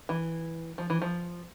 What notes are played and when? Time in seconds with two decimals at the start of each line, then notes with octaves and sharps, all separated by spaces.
0.09 E3
0.78 F3
0.90 E3
1.02 F3